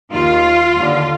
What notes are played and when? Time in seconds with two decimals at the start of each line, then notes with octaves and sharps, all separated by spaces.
0.12 D#2 D#3 F4
0.77 D#2 D3